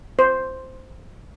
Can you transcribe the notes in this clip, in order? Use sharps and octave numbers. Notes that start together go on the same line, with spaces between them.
C5